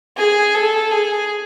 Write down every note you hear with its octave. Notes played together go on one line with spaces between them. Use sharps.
G#4
A4
G#4